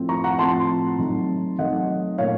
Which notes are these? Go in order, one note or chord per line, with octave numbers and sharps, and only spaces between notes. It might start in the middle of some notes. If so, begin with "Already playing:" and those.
Already playing: A2 F3 C4
A#5 C#6
F#5 A#5
A2 F3 C4 A5 C6
C3 F#3 A3 D#4
C3 F#3 A3 D#4 D#5 F#5
A#2 A3 C#4 C#5 F5